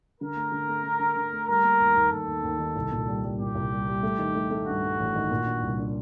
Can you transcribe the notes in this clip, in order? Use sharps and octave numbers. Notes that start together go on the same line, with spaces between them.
D3 A#4
A3
D3
A3
D3
D3
D3
A3
G3 A#4
A#3
D#2
D#2
D#2 A4
D#2
D#2
D#3
C2
A#2
G3
G3
A#2 G4
C2
G3
G3
A3
D#3
A3
A3
G2 F#4
G2
A1
D#3
A#2
D4
C2
D4